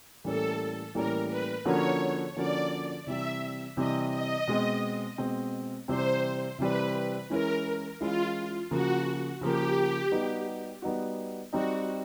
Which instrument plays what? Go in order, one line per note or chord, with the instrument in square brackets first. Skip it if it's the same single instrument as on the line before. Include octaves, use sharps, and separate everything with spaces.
[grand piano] A2 E3 G3 A#3 C#4 [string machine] A4
[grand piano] A2 E3 G3 A#3 C#4 [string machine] A#4
[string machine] B4
[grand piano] D3 F3 A#3 C#4 F#4 [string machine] C#5
[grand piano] D3 F3 A#3 C#4 F#4 [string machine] D5
[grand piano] C3 E3 G3 C4 [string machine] E5
[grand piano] C3 E3 G3 C4 [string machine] D#5
[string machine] D#5
[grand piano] B2 G#3 C4
B2 G#3 C4
[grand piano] C3 E3 G3 C4 [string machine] C5
[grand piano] C3 E3 G3 C4 [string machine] B4
[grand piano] E3 G#3 C#4 E4 [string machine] A#4
[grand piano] E3 G#3 C#4 E4 [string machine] F4
[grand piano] C#3 F3 A#3 [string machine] F#4
[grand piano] C#3 F3 A#3 [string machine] G4
[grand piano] G3 B3 D#4 F#4
G3 B3 D#4 F#4
[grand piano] G3 C4 D#4 [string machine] F#4